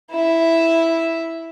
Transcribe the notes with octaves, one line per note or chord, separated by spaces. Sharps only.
E4 E5